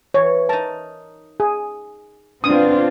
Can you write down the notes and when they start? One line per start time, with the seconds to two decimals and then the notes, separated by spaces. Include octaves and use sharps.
0.14 E3 C#5
0.49 D#4 A#4 A5
1.40 G#4
2.44 B2 C4 D4 F4 D#6